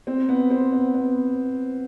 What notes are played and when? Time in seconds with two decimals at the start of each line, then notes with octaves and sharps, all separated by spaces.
0.07 C4
0.29 B3
0.50 C4
0.72 B3
0.94 B3